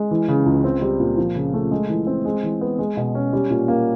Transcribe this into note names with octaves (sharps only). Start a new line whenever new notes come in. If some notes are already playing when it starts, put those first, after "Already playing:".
Already playing: G#3
E3
C#3
C#2
C4
G3
A#2
F3
C#3
A3
G#3
E3
C4
G#3
E3
B3
G#3
B2
C#4
G3
A#2
A#3